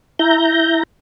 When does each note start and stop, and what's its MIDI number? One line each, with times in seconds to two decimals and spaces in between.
0.19 0.83 64
0.19 0.83 82
0.19 0.83 91